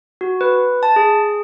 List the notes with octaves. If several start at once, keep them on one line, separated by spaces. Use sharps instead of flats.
F#4
B4
A5
G#4